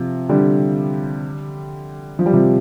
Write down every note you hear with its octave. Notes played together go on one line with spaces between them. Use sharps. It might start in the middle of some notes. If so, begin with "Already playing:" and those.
Already playing: C3 F3
D3 G3
F3
G3
C3 F3